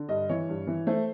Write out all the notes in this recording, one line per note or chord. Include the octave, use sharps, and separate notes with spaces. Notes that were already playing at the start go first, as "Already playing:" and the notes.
Already playing: D3
G2 D#5
E3 C#5
G2
E3
A3 C5